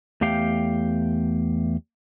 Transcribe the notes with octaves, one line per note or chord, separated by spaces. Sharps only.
E2 A3 G4 F5 G5